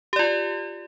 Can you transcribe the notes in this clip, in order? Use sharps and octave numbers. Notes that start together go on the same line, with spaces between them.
F4 G4 D5